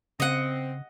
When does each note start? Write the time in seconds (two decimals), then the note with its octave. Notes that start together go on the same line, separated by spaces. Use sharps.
0.20 C#3 C4 D#5 F#5